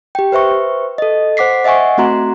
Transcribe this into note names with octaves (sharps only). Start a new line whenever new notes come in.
G4 G5
B4 C5 E5 C#6
A4 D#5
C5 F#5 D6 B6 C7
D#5 E5 F#5 G#5 C#6
A3 C4 F#4 A#5 C6